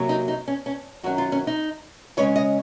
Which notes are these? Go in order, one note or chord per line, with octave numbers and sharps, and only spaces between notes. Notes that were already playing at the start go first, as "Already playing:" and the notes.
Already playing: C3 F#3 A#3
D#4
D#4
C#4
C#4
F#2 D#3 F#3 C#4 F#4
F4
C#4
D#4
C#3 G#3 C#4 C#5
D#5